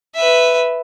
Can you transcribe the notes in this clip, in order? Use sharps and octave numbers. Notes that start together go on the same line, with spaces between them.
B4 E5